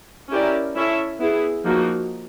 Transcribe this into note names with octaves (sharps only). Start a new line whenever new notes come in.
C#4 E4 G4 A#4 D5
C#4 E4 A4 C#5 E5
B3 E4 G#4
F3 A#3 D#4 F#4